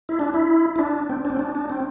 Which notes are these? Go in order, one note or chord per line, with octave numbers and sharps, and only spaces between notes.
E4
D4
E4
E4
D4
C4
D4
C4
D4
D4
C4